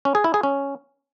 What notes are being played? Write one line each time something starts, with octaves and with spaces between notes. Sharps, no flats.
C#4
G#4
E4
G#4
C#4